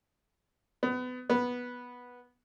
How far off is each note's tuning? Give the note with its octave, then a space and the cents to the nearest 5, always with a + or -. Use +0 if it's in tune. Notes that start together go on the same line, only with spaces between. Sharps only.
B3 +30
B3 -5